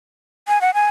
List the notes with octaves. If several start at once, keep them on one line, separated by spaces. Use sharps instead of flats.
G#5
F#5
G#5